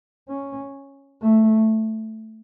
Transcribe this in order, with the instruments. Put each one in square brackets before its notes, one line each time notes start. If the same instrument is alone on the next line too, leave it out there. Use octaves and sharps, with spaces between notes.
[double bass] C#4
A3